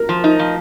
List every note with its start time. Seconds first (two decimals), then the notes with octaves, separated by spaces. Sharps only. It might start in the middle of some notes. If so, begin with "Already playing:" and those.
Already playing: A#4
0.09 F3
0.24 D#4
0.39 F3